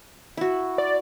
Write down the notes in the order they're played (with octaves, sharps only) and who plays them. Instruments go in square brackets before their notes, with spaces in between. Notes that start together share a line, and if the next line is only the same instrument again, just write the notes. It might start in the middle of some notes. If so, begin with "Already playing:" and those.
[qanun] E4 F#4
[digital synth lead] D5